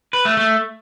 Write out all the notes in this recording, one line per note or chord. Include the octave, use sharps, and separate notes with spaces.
B4
A3
A3